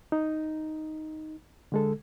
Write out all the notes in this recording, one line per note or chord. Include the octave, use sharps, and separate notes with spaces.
D#4
D3 G#3 A4